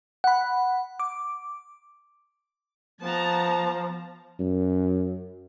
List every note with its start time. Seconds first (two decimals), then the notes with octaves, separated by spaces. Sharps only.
0.24 F#5 B5
1.00 D6
3.01 F3 B3 A5 A#5
4.40 F#2